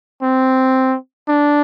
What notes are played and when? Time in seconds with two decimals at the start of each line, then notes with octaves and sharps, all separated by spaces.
0.22 C4
1.28 D4